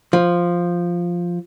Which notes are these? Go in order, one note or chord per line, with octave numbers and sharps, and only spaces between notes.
F3